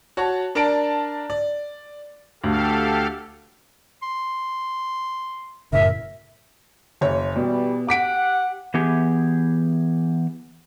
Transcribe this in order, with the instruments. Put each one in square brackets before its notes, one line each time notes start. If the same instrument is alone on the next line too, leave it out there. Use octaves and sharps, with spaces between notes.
[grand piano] F#4 C#5 A5
D4 A#4 D5 A5 D7
D5
[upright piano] D2 [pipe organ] G4 A4 F5
[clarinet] C6
[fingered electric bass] F#2 A2 C#3 [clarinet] A#4 [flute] E5
[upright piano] F#1 C#5
[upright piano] B2 [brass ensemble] E3 G3
[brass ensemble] G4 F#5 [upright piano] D6 B6 D7
[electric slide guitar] E3 B3 G4 G#4